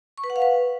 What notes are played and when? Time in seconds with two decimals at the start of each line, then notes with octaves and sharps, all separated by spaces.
0.18 C#6
0.24 B4
0.30 F#5
0.36 F5
0.42 B4